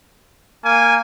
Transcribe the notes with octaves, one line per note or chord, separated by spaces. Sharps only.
A#3 G#5